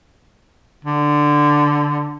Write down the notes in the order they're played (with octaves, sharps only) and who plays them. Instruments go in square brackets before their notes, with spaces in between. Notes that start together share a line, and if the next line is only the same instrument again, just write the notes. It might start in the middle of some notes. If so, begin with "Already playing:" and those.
[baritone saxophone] D3